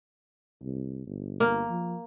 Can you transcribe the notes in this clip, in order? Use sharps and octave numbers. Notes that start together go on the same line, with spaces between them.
C2
G1
A#3
F3